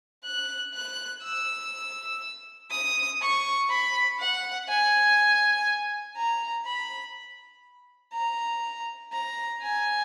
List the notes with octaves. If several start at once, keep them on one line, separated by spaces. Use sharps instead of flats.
F#6
F#6
E6
D#6
C#6
B5
F#5
G#5
A#5
B5
A#5
A#5
G#5